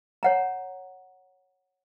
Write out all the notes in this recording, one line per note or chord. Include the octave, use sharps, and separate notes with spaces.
C#5 F#5 A#5